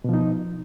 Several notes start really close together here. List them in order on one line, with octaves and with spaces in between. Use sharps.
B2 F3 D#4